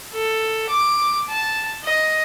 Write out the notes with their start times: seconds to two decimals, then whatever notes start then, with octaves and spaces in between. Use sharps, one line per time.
0.12 A4
0.69 D6
1.29 A5
1.85 D#5